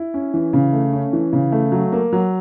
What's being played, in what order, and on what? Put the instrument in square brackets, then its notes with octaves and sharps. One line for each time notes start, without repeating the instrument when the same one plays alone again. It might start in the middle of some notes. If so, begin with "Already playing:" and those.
Already playing: [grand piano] E4
C#4
E3
C#3
A3
C#4
E3
C#3
A3
F#3
A#3
F#3